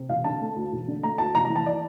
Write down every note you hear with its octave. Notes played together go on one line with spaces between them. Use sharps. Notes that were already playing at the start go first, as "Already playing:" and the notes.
Already playing: C3
E1 F5
D3 A5
A3
D2
E1
D3
A3 A#5
D2 A5
F1 A#5
A#5
E3
A5
D5